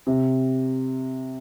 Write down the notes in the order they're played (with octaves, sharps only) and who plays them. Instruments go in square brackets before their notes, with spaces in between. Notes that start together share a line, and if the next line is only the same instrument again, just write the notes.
[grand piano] C3